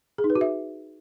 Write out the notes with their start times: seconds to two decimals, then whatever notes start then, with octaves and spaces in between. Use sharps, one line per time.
0.18 G#4
0.24 D#4
0.30 B4
0.35 F#4
0.41 E5